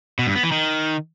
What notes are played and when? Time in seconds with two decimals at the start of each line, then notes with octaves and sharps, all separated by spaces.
0.19 B2
0.27 G2
0.35 B3
0.43 E3
0.52 D#3